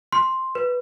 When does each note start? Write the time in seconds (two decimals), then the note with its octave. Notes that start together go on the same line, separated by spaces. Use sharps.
0.12 C6
0.55 B4